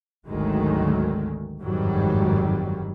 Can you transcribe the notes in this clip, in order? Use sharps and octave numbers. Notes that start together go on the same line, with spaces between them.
G#1 D2 D#3 F#3 G#3 A3
G1 F2 G#2 D#3 F#3 G3